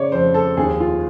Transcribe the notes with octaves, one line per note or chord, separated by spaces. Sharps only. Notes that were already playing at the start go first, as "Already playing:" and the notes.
Already playing: C#3 C#5 D5
F2 C5
A4
D#2 G#4
F4